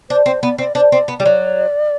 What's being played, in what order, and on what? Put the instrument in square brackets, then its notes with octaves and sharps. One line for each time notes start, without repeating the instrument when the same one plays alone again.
[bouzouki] D4 [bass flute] C5
[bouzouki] C4 [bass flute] C5
[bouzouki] B3 [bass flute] D5
[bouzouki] C4 [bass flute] D5
[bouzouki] D4 [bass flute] C5
[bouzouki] C4 [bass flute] D5
[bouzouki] B3
G3
[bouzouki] F#3 [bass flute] D5